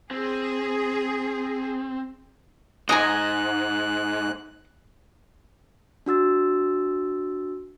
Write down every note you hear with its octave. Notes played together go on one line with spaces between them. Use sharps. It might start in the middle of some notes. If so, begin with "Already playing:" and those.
C4 G#4
B1 G#2 D#5 G#5 A#5 F#6
D4 F#4 E6 A6